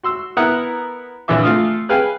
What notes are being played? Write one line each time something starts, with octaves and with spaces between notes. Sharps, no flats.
F#4 C6 E6
B3 E4 A#4 F#5 D#6 F#6
A#1 D3 E3 E5 D6
A3 F4 F5 D#6
G#4 B4 F5 G5 G#5